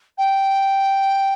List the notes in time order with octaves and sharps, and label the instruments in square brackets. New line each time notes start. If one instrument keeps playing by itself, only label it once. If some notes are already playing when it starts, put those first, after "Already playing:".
[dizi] G5